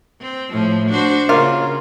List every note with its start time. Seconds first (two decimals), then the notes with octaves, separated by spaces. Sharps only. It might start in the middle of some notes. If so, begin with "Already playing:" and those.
0.21 C4
0.51 A2 F3
0.90 D4 F#4 C5
1.29 C#3 A#3 F4